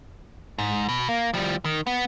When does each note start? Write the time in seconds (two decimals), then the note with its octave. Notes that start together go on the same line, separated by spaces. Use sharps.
0.58 G#2
0.89 B2
1.09 A#3
1.34 F3 G3
1.65 D#3
1.87 B3